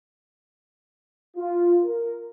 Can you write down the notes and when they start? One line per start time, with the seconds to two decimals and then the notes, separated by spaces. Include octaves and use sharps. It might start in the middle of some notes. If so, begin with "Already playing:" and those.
1.37 F4
1.84 A#4